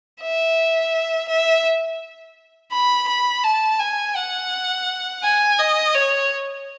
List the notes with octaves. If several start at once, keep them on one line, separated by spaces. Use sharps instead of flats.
E5
E5
B5
B5
A5
G#5
F#5
G#5
D#5
C#5